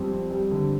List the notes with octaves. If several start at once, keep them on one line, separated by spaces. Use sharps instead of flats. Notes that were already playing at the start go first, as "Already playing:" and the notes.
Already playing: F2 G3 C4
C4
G3
D3